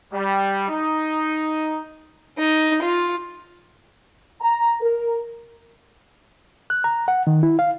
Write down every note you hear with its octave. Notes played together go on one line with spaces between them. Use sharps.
G3
D#4
D#4
F4
A#5
A#4
F#6
A#5
F#5
D#3
E4
F5